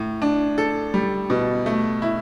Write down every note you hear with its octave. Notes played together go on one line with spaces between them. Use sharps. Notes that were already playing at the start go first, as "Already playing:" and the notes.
Already playing: A2
D4
A4
G3
B2
A3
E4